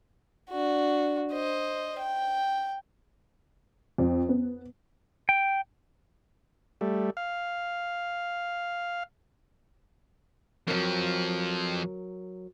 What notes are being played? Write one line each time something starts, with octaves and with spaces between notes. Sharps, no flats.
D4 F#4
C5 D#5
G5
F2
B3
G5
G3 A3
F5
F2 F3 F#3 A#4